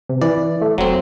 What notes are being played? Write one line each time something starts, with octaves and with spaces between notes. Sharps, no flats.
C3
E3 D5
A3
E1 F#3 C4